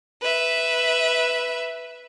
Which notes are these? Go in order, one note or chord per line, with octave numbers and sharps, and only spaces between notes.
B4 E5